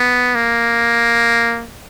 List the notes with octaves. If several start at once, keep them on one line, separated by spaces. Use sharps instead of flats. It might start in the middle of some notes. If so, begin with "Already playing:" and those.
Already playing: B3
A#3